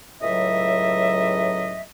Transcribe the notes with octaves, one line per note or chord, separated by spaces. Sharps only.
C#2 A2 C#3 F#3 D#5 E5